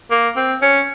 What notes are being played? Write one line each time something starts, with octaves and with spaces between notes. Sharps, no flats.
A#3
C4
C#4